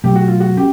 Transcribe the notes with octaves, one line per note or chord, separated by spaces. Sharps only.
B2 F#3 A3 G4
F#4
F4
F#4
C#4 G4